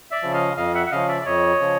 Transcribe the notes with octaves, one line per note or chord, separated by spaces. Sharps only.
D5 E5
C#3 F3
D#5 F5
F2 D#5 F5
E5 F#5
F#5
C#3 F3 D#5 F5
D5 E5
D5
F2 C#5 D#5
C#3 F3